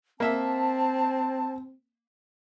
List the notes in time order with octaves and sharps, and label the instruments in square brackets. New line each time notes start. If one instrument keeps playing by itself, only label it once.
[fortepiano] A#3 E5 [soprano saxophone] C4 [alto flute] A5